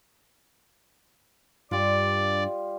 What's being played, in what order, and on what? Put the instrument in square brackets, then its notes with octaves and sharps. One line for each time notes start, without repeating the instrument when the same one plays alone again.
[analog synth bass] G2 [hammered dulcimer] G3 F4 [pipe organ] D5